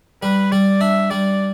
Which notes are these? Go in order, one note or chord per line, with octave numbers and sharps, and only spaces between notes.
G3 B4
G3 D5
D4 E5
G3 D5